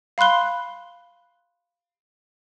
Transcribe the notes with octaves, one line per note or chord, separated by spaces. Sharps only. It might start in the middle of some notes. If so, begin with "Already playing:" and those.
F5 B5 C6 F#6 G7